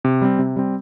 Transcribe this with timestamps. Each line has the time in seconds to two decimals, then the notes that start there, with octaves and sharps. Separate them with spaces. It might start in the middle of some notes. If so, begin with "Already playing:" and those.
0.05 C3
0.22 G3 C4
0.39 C3
0.56 G3 C4